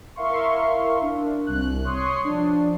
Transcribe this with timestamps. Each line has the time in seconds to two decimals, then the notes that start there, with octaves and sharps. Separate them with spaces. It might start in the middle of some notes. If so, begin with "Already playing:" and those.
0.16 E4 A#4 E5 F5 C6 C#6
1.01 D4
1.46 C2 F#6
1.84 C#5 C6 C#6 D#6 C7
2.24 F3 D4